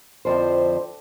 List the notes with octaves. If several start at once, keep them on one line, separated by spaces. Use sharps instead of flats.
F2 D3 F3 C4 E4 C5